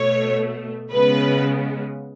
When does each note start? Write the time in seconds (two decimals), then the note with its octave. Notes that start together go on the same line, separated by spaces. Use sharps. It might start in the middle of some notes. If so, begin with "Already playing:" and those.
Already playing: B2 A3 C#5
0.92 C#3 G#3 B3 B4